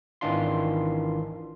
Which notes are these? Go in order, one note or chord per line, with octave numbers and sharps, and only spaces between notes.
G#1 D#3 E3 D4 F4 C6